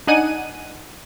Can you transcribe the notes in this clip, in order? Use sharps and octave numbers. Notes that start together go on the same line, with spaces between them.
D4 D#4 F#5 G#5 D#7